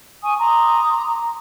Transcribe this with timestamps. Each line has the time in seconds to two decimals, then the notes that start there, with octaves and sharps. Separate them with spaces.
0.23 G#5 C#6 D#6
0.40 A#5 C6 D6 D#6